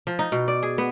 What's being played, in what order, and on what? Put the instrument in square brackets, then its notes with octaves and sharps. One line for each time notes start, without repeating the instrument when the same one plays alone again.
[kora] F3
D#4
B2
D5
G#4
B3